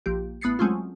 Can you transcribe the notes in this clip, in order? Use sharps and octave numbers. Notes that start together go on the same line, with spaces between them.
A#1 F3 G4
A1 B3 D#6 A6 C7 C#7
F#3 G#3 A3 C4 C#4 F4